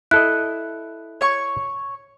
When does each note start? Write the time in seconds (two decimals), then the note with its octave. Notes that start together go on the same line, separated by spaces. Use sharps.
0.11 E4 A4 D#5 F#6
1.21 C#5 C#6